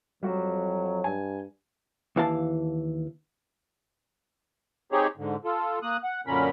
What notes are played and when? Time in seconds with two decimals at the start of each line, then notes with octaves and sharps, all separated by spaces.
0.23 F2 F#3 G3 F#4
1.04 G2 G#5
2.16 D#2 E3 F5 A5
4.92 C4 D#4 G4 G#4 C#5
5.17 G#2 D3
5.45 F4 A4
5.83 A#3 D#6 F#6
6.03 F#5
6.27 F#2 A#2 D3 C#4 A#4 B5